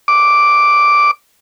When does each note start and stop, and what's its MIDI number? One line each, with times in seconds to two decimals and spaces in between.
0.08 1.11 86